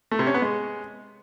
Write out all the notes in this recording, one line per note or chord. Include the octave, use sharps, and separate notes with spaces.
A3
C3
C#4
B3
G#3